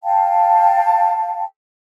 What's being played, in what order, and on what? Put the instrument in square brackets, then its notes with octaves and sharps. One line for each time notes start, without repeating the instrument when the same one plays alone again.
[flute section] F5 G5 A5